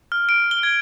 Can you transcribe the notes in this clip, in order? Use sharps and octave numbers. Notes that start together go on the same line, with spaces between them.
F6
D7
G7
G#6